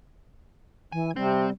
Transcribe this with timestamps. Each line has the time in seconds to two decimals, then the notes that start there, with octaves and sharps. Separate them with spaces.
0.92 E3 G#5
1.16 C3 G3 C4